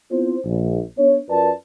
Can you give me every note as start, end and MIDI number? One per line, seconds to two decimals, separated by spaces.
0.11 0.36 59
0.11 0.36 60
0.11 0.36 64
0.11 0.36 65
0.11 0.36 72
0.45 0.80 34
0.98 1.17 59
0.98 1.17 62
0.98 1.17 73
1.29 1.51 42
1.29 1.51 65
1.29 1.51 70
1.29 1.51 71
1.29 1.51 74
1.29 1.51 81